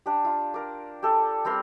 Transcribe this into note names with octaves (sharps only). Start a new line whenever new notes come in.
D4 G4
F4
A#4 D5
G4 A4
G3 C4 A#4 C6